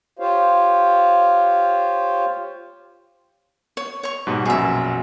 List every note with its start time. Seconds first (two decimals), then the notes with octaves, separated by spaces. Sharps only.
0.19 F4 G4 C5 C#5 F5
3.77 C#5
4.03 C#5 C#6
4.27 G#2 B2 G3
4.45 A#1 F#2 B2 G#4 E5